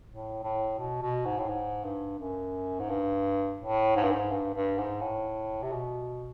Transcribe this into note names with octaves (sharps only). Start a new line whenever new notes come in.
A2
A2
B2
B2
G#2
A2
G#2
G2
F#2
G#2
G2
A2
G#2
G2
G#2
G2
G2
G#2
A2
C3
B2